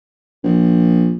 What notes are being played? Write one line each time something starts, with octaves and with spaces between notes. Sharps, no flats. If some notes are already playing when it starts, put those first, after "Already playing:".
A#1